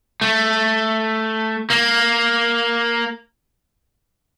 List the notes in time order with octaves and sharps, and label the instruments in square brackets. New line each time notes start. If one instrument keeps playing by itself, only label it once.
[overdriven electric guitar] A3
A#3